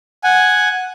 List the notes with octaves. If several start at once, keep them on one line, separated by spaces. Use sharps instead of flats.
F#5 G#5